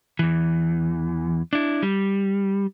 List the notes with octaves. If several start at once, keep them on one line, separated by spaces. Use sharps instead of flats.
E2 E3
D4 E4
G3